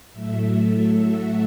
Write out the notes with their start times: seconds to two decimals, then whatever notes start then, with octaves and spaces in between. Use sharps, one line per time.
0.12 A2 F#3 A3 E5
0.57 A4
1.01 F#4